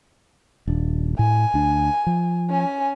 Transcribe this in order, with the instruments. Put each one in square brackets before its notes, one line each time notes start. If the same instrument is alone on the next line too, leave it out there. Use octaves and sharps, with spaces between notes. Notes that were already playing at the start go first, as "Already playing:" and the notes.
[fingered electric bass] D#1 D4
[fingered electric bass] A2 [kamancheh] G#5
[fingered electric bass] D2 D4
F3
[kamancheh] C#4 G#5